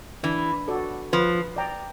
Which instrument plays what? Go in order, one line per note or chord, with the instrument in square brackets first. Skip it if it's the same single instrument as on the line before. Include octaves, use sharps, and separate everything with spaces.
[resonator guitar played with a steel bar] E3 [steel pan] D4
[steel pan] F#4 A4 D5
[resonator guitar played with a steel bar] F3 [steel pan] B4
[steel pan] D5 G5 A#5